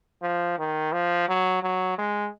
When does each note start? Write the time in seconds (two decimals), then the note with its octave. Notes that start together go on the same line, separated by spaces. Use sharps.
0.22 F3
0.58 D#3
0.92 F3
1.28 F#3
1.63 F#3
1.98 G#3